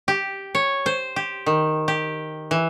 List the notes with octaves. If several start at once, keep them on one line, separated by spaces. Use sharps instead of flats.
G4
C#5
C5
G4
D#3
G4
E3